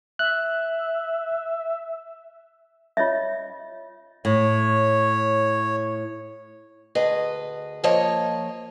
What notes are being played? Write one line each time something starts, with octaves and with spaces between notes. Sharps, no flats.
E5 F#6
F4 C#5 D#5 E5
A2 C#5
D2 G#4 B4 D#5
F3 A#3 C#5 D#5